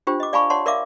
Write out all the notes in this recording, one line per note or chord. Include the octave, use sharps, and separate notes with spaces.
D4 F4 G4 C5 G5
D#5 D6
D5 F5 G#5 A5 B5 C#6
C#5 D5 F#5 A5 C6
A#4 D5 E5 F5 D6